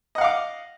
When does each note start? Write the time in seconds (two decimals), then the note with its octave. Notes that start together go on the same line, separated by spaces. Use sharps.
0.15 D#5
0.18 F#5
0.21 F5
0.24 D6